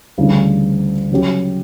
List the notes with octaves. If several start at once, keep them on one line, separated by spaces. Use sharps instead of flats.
D2 C#3 E3 G3 D4
C#3 F#3 C#4 G4